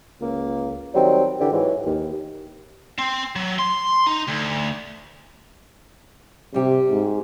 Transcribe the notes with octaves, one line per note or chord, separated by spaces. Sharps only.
C#2 A#3
D#3 F#3 G3 C4
D3 E3 G4
G#2 E3 F#3 G#3
D#2
C4
F#3
C6
D#4
D2
C3 G3 G4
G#2